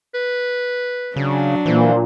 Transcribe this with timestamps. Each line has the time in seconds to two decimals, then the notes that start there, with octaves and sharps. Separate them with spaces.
0.15 B4
1.16 C#3 F#3 D4
1.66 A#2 E3 C5